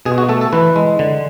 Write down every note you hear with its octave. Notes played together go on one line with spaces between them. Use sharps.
B2 G#4
F#4
A3 A4
A4
E3 B4
G#3
D3